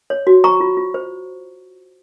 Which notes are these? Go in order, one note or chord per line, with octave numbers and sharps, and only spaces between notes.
C#5
F#4
C5 A#5 C#6
F4
F4
C5